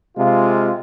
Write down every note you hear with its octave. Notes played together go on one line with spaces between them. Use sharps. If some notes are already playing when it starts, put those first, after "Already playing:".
C3 G#3 F4